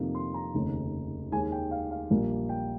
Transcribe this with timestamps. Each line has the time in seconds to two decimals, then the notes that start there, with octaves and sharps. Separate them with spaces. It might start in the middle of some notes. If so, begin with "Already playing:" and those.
Already playing: F2 C3 D#3 A#3
0.15 C6
0.34 A#5
0.54 F1 D#2 C#3
1.32 D#2 D#3 G#3 G#5
1.52 G5
1.71 F5
1.91 F5
2.10 A#1 A#2 G3 A#3
2.49 G5